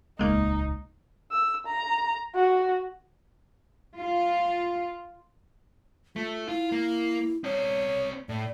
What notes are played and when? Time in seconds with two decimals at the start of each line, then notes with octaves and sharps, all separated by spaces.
0.19 D#1 C#2 G#3 A#3 D#4
1.32 E6
1.66 A#5
2.36 F#4
3.98 F4
6.16 A3 F4
6.48 E4 F4
6.72 A#3
7.44 C4 C#5 D5
8.29 A2 D5